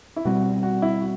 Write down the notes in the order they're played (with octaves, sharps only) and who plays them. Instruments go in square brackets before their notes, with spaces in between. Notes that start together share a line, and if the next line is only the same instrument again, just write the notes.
[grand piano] E4
[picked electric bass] B2 G3 C4 [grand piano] F#4
[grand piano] F#4
E4
F#4